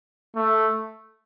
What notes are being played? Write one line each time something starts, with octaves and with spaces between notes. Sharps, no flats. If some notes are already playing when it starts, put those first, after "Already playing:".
A3